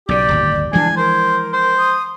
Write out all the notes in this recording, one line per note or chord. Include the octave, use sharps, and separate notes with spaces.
B1 C#3 G4 D5
D1 G1 D#2
E3 F3 G#3 D4 G#5
A#4 C5
C5
D#6